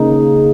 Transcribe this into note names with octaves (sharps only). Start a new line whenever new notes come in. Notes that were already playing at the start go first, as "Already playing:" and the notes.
Already playing: C#3 A#3 D#4